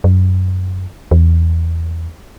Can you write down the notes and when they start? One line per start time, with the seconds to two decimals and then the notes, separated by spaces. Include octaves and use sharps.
0.04 F#2
1.11 E2